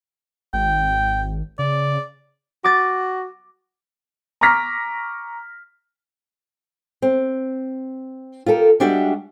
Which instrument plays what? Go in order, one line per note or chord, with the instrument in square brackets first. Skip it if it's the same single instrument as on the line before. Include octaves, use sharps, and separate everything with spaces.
[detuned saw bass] G#1 [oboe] G5
[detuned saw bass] C#3 [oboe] D5
[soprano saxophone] F#4 [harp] D6 A6
[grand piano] A#5 C#6 D6 F6 A#6 B6
[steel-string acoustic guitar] C4
F4 G4 A4 A#4
G3 G#3 D4 F#4 G4 E5